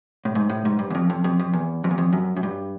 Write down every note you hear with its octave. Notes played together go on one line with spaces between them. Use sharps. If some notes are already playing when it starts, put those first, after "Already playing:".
A2
G#2
A2
G#2
G2
E2
F2
F2
F2
F2
E2
F2
E2
F2
F#2
F#2
G2